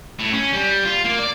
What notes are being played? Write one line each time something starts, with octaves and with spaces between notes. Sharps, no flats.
A2
C#4
G3
F4
A#3
D5